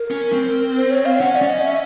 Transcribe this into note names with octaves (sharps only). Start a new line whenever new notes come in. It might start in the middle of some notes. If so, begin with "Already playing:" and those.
Already playing: A#4
C#4
C4
C5
C#5
F5
C#4 F#5
D5
C#4
D#5
E5